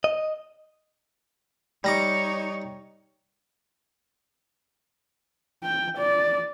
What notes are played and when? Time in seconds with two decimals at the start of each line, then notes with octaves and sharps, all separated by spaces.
0.04 D#5
1.84 G3 D#4 C#5 A#5 D6
5.63 G5
5.98 D5